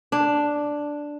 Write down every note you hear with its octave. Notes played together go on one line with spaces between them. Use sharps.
D4